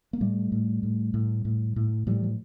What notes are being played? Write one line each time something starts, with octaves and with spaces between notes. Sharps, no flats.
A#3
A2 G3 A3
A2
A2
A2
A2
A2
A2 F3 G3
F3